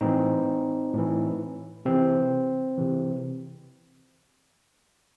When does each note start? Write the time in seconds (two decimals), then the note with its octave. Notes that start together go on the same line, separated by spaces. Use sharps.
0.01 A2 E3 C4 D#4
0.94 A2 E3
1.85 C3 E3 C4
2.78 C3 E3